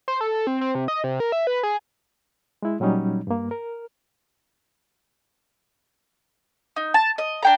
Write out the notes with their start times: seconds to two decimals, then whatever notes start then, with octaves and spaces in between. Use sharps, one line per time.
0.08 C5
0.21 A4
0.35 A4
0.47 C4
0.61 C4
0.75 C3
0.88 D#5
1.04 C3
1.20 A#4
1.32 E5
1.47 B4
1.63 G#4
2.62 G#3 E4
2.80 A#2 F#3 G3 C#4 D#4
3.27 G2 A#3
3.51 A#4
6.76 D#4
6.94 A5
7.18 D#5
7.43 D4 G5 A#5